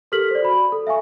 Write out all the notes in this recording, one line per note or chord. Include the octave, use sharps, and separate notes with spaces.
G4 A4 A#4 F6 B6 F#7
C5 D5
F#4 B5
A4
E5 F5 G#5 C#6